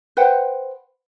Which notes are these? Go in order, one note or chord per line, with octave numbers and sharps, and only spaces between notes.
B4 C5 F#5 G5